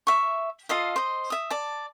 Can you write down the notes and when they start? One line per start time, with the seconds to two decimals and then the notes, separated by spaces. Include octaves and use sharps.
0.07 E5 C#6
0.69 F4 A4 D#5 F5
0.96 C5 D#5
1.30 E5 D#6
1.50 D5 A5